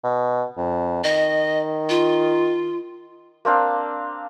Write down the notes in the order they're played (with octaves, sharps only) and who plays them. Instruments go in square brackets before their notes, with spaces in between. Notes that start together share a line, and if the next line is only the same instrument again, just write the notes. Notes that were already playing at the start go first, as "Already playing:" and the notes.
[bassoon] B2
F2
[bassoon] D#3 [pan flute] D#5
[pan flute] F4
[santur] A#3 C4 D4 F5